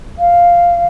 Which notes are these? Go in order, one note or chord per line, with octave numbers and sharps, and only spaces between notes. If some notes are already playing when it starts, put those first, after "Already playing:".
F5